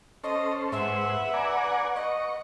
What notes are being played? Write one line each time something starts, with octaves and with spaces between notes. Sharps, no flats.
C#4 A4 C5 D#5
G#2 B4 C5 E5 F#5
D5 G#5 A#5
D#5 C#6